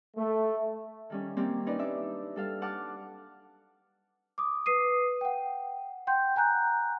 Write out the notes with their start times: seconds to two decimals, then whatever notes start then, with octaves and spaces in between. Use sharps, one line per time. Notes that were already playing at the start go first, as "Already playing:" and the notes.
0.17 A3
1.10 D#3 G3 C#4
1.37 F#3 G3 A#3 C4 G4
1.66 C#4 D#4 B4 D5
1.79 D4 D#4 E5 D6
2.36 G3 A4 F5
2.62 F#5 A5 D6 F6
4.38 D6 D#6
4.66 B4 D#6 C7 D#7
5.21 F#5 G5
6.07 F#5 G5 C6 G6
6.36 F#5 G#5 A#5 F#6 G6